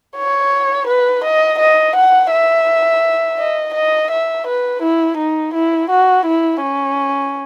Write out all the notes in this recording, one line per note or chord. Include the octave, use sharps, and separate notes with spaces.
C#5
B4
D#5
D#5
F#5
E5
D#5
D#5
E5
B4
E4
D#4
E4
F#4
E4
C#4